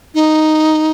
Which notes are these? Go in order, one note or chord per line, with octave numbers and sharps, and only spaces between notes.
D#4